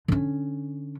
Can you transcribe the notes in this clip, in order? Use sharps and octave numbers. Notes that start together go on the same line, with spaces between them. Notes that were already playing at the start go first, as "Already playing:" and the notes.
D3 C#4